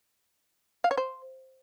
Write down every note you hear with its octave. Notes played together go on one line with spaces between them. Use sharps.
F5
C#5
C5